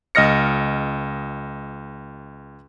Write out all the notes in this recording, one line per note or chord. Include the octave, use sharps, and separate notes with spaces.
C#2 D#5 F6 A#6 C#7